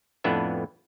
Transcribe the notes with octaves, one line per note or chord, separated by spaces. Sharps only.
F2 A2 B3 D4 B4 E5